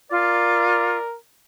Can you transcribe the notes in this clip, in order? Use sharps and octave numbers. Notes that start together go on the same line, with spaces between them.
F4 A#4 D5